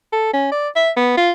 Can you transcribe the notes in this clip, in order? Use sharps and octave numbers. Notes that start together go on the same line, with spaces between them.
A4
C#4
D5
E5
B3
F4